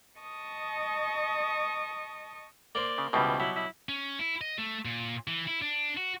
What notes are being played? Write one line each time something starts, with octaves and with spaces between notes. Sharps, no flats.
D#5 A5 C#6 D#6
A#3 C5 D5
C#3
C#2 B2 E3 G3 C4
F#3 E4
E4
C#4
E4
D#5
A3
A#2
E3
E4
D4
F#4